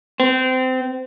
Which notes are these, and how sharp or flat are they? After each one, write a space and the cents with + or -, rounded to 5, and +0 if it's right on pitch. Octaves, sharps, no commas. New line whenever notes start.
C4 -25